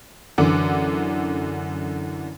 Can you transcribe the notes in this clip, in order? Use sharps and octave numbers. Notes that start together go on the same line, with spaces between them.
F#2 D3 E3 F#5 D6